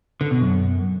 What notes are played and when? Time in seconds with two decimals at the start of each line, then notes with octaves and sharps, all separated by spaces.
0.21 D3
0.31 B2
0.41 F#2